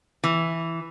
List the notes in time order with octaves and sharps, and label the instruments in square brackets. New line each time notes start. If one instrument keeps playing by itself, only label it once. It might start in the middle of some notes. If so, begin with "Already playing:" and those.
[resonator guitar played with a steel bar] E3